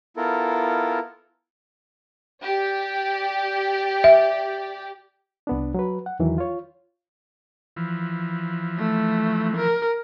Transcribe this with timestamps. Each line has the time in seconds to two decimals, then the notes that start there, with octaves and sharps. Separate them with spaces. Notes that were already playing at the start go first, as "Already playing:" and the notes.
0.17 B3 E4 F4 A4 A#4
2.43 G4 D5
4.04 E5
5.47 C2 B3 D4
5.74 F#3 B4
6.06 F#5
6.19 E2 D#3 E3 F#3
6.38 F4 C#5
7.77 E3 F3
8.78 A3
9.57 A#4